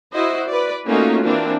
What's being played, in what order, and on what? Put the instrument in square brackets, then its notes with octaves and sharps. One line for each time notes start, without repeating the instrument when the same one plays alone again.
[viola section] E4 F#4 C5 D#5
B4 D5
A3 A#3 C#4 D#4 F4 F#4
E3 A#3 C4 D4